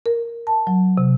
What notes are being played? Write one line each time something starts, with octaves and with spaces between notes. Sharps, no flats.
A#4
A5
F#3
C3